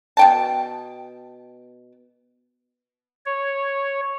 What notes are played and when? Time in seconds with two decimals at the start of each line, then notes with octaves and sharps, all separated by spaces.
0.17 B2 G5 A5
3.26 C#5